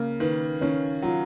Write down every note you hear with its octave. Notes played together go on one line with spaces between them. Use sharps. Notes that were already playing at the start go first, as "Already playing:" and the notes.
Already playing: C#3 A#3
D#3 B4
D#3 C#4
F#3 F4